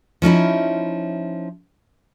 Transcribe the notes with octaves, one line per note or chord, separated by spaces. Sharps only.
F3 C#4 D#4 E4